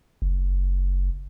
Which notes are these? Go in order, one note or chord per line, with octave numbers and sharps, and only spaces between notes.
F#1